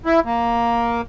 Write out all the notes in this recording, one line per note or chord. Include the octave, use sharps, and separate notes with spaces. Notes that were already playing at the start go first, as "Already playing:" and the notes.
E4
A#3